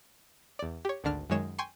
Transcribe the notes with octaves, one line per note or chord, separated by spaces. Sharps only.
E2 D5
G4 C#5
G#1 D2 D3 D4 F6
F#2 D#3 G#3 C#5 E7
G5 G#5 C6 C#6